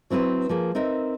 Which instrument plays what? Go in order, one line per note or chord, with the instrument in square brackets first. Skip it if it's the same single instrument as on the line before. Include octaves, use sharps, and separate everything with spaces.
[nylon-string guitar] F#3 C4 E4 B4 C5
F3 A#3 G#4
C4 D#4 A#4 E5